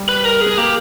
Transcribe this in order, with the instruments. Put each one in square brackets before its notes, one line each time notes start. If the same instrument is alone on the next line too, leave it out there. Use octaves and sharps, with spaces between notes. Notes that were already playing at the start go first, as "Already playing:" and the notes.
Already playing: [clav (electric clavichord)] G3
[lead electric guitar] B4
A#4
G#4
[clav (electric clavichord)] A#3 [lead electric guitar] G4